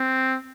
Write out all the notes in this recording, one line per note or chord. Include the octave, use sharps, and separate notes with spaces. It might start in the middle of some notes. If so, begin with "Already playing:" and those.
Already playing: C4